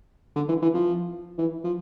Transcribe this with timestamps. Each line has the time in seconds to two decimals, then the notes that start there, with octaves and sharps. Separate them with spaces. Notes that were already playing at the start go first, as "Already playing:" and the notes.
0.36 D3
0.49 E3
0.62 E3
0.74 F3
1.38 E3
1.64 F3